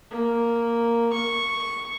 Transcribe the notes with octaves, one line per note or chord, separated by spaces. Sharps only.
A#3
C#6